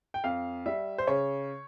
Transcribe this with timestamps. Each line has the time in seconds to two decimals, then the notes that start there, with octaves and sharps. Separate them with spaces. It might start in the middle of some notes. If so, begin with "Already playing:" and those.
0.14 G5
0.24 F2 F5
0.66 G3 E5
0.98 C5
1.07 C#3 C#5